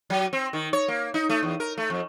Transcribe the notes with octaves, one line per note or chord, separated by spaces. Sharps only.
F#3
C4
D#3
C#5
A#3
D#4
A3
E2
A#4
A3
F2